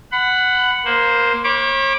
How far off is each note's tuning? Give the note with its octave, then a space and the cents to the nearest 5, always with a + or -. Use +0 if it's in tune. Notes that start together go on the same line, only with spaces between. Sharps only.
F#5 +0 B5 +25
A#3 +15 C5 +0
C#5 -40 B5 -20 D6 +0